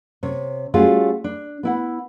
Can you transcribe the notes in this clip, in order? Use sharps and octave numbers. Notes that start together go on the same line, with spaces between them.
C3 C#5
G3 A3 C#4 F4 F#4 G#4
D4
B3 E4 F#5